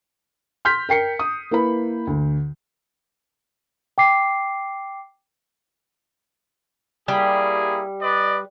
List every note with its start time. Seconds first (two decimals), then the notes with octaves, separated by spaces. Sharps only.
0.65 C6 F6 G6 B6
0.89 A#4 G5 C7 C#7
1.19 D#6
1.51 A#3 E4 B4 B5
2.07 D2
3.98 G5 D6 C7
7.08 G3 A#3 E4 G#4
8.01 B4 D5 D#5